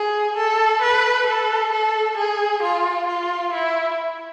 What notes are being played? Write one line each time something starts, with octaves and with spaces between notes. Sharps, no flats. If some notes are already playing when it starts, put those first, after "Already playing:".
Already playing: G#4
A4
B4
A4
A4
G#4
F4
F4
E4